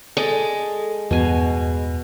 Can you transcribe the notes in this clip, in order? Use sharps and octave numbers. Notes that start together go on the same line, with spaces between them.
G#3 A4 D5 D#5
E2 G2 B2 G#5